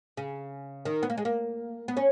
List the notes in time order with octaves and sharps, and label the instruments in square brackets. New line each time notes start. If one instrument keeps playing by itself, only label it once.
[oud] C#3
D#3
B3
A#3
G#3
A#3
B3
C#4